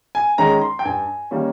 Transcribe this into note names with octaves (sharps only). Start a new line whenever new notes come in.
G#5
D#3 G#3 C#4 A#5
C6
G5
G2 G#5
D#3 G3 A#3 C#4